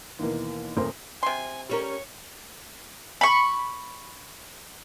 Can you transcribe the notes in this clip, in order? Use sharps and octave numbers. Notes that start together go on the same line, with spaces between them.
D#2 B2 E3 A#3
D#1 A3 C4 A#4 C6
C3 G#5 C6
G3 C#4 A#4 C#5
B5 C#6